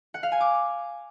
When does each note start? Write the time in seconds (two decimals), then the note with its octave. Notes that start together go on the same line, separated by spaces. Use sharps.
0.14 F#5
0.23 F5
0.32 G#5
0.40 D6